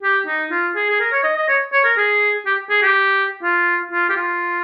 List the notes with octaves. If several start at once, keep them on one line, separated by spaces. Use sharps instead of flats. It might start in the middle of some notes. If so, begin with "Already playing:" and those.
G4
D#4
F4
G#4
G#4
A#4
C#5
D#5
D#5
C#5
C#5
A#4
G#4
G4
G#4
G4
F4
F4
G4
F4